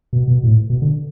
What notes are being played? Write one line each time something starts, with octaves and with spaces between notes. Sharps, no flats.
B2
B2
A2
B2
D3